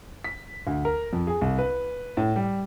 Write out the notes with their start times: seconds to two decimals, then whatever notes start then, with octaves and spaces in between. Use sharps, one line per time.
0.24 B6
0.67 D2
0.85 A#4
1.13 F2
1.27 G#4
1.41 C2
1.58 B4
2.17 A2
2.36 G3